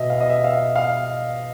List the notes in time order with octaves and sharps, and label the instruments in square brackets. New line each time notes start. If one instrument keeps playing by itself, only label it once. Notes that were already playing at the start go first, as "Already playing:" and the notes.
Already playing: [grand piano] B2 D#5 E5
F5
D#5
E5
F5
E5
F5